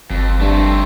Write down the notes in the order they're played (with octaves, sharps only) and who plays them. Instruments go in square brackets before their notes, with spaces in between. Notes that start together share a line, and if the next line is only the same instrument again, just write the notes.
[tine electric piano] G1 [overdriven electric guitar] F2
[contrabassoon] G2 [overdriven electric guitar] A3 C4